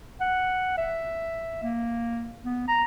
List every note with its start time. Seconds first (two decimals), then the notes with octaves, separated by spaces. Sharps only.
0.21 F#5
0.77 E5
1.63 A#3
2.45 B3
2.68 A#5